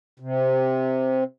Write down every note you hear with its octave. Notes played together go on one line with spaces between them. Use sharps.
C3